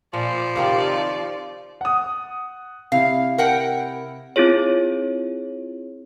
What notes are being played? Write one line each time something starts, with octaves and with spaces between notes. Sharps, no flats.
A#2 F3 D5
C3 D#3 G4 F5
F#5 D#6
C3 E4 F5
A#4 F#5 G5
C4 E4 F4 G#4 C#5